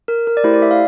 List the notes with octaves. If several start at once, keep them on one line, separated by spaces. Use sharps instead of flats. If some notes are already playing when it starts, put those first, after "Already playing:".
A#4
A#4
D5
A3 E4 G4 C5
D5
E5
F5